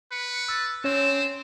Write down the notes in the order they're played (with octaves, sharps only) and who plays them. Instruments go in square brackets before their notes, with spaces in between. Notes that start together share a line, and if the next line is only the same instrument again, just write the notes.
[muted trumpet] B4 [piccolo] C#7
[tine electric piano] E6 [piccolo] A6
[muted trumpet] C4 [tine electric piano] C#4 C#5 [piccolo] E7